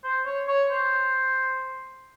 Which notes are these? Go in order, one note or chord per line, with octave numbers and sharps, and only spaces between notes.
C5
C#5
C#5
C5